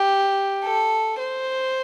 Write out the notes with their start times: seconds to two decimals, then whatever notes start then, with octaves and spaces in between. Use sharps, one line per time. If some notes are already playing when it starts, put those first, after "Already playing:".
Already playing: G4
0.64 A4
1.19 C5